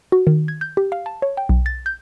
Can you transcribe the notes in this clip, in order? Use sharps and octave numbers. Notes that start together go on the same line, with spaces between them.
F#4
D#3
G#6
G6
G4
F5
A5
C#5
G5
B1
A6
G6